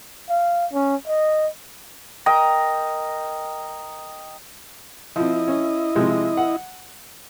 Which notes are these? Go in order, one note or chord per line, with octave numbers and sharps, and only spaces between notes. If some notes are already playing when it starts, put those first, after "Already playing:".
F5
C#4
D#5
A#4 D#5 G5 A#5
F3 C4 E4 D#5
C#4
C3 F3 G#3
F#5